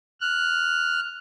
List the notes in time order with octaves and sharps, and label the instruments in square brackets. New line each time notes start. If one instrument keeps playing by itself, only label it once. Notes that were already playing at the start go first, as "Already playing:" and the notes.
[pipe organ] F6 F#6